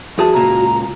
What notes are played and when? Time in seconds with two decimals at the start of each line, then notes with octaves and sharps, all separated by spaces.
0.18 E2 F#4 G#4 A5
0.34 C#2 A#2 A#5